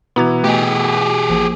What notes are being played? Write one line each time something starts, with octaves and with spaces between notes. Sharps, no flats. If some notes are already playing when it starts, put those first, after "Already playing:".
B2 E3 B3 E4 F#4 A#5 D6 G#6
A3 G4 G#4 D#5
A1 F3 A#3